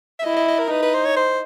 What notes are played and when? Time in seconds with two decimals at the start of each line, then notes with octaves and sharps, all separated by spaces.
0.19 E5
0.24 E4 D#5
0.36 D#5
0.48 D#5
0.59 A#4
0.71 D#4 B4
0.82 B4
0.94 C5
1.05 C#5
1.16 C5